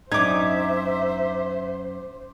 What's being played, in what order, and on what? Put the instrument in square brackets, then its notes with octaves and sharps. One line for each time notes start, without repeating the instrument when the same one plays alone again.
[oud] F#2 D#4 [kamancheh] C5 [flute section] E5 [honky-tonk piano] D6 G#6